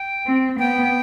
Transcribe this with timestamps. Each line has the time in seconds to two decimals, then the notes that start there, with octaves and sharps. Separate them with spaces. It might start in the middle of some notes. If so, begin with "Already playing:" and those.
Already playing: G5
0.25 C4
0.59 B3 G5